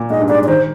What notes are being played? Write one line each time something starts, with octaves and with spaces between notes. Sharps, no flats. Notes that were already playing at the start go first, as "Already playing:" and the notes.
Already playing: A#2
G#2 D#5
G2
G#2 D5
D5
D#3 C5